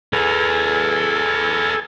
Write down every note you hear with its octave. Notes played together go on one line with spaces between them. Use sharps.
G#4 A4 B4 G#5